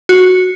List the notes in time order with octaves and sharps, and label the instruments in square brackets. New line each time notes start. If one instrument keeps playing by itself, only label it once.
[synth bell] F#4